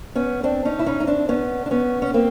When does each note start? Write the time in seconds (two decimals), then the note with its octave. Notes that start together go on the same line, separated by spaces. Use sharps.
0.16 B3 C#4
0.43 C4 D4
0.65 C#4 D#4
0.79 E4
0.86 C#4 D#4
1.00 D#4
1.07 C4 D4
1.29 B3 C#4
1.66 D4
1.71 B3 C#4
2.02 C#4
2.14 A#3 C4